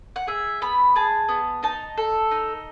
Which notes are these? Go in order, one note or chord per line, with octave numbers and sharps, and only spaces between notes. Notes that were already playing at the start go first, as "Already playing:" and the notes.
F#5
G#4 E5
B3 B5
G#4 A5
B3
D#4 A5
A4
D#4